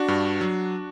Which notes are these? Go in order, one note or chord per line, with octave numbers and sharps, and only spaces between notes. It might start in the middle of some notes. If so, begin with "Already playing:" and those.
Already playing: D4 F#4
G2
F#3